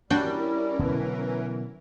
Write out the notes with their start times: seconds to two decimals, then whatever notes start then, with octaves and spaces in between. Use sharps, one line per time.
0.10 G3 C#4 D4 E4 F#4 A#4 G5
0.79 B2 D3 E3 F#3